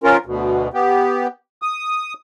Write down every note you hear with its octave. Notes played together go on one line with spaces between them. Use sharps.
F3 C#4 F4 A#4
D2 B2
B3 G4
D#6